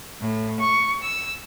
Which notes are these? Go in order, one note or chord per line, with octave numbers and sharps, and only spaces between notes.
A2
C#6
E6